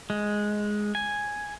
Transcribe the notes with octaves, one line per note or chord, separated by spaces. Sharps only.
G#3
G#5